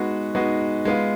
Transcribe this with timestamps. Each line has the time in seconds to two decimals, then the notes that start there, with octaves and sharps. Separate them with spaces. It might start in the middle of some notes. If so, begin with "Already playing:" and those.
Already playing: G#3 B3 D#4 F#4
0.35 G#3 B3 D#4 F#4
0.85 G#3 B3 F4